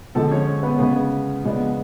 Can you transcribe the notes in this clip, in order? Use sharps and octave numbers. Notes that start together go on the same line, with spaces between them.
D3 F3 G#3 A4 A5
C#4 C#5
B3 B4
C#3 G#3 B3 C#4 B4
C#3 F3 G#3 B3 D4